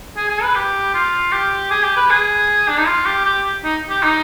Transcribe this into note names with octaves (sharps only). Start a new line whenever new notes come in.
G#4
G#4
B4
G4
F4
G4
G#4
G4
B4
G#4
D4
D#4
F4
G4
G4
D#4
G4
D#4